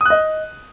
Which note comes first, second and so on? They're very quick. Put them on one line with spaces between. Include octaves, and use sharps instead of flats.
D#6 F#6 D#5